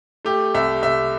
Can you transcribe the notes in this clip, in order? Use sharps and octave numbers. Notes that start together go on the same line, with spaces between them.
A3 G4
C2 E5
C2 E5